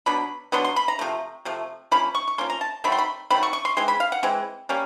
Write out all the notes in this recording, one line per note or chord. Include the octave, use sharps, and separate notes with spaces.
B2 F#3 B3 D4 B5
B2 F#3 B3 D4 C6
C6
B5
A#5
C3 F3 A3
C3 F3 A3
F3 A#3 C#4 B5
C#6
C#6
F3 A#3 C#4 C6
A#5
A5
D#3 F#3 A3 C4 B5
C6
B5
D#3 F#3 A3 C4 B5
C#6
C#6
C6
E3 G#3 C4 C6
B5
F5
F#5
E3 G#3 C4
G3 A#3 C#4